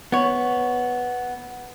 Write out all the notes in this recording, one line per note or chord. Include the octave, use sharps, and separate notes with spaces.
B3 C#5